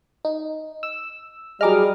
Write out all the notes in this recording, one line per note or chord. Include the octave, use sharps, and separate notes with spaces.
D#4
E6
F#3 G3 G#4 D#5 G#5 A#5 D6 F6